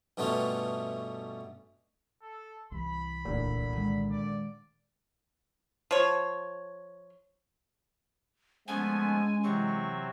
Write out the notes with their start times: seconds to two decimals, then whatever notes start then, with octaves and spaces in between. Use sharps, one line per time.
0.17 G2 B2 A3 B3 C#4 F4
2.22 A4
2.72 C2 E3 B5
3.25 D1 A#2 D3
3.73 D#3 G#3
4.11 D5
5.91 F3 C#5
8.68 F3 G#3 A3 B3 C#4 G#5
9.44 C3 E3 F#3 C4 C#6